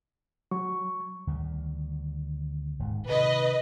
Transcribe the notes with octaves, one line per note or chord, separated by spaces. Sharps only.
F#3 C#6
D2 D#3 G3
D#1 G#2
C3 D#3 B4 D#5